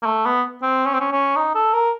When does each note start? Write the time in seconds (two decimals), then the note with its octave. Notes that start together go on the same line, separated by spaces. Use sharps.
0.02 A#3
0.06 A3
0.25 B3
0.62 C4
0.86 C#4
0.94 C4
1.00 C#4
1.12 C#4
1.36 D#4
1.55 A4
1.73 A#4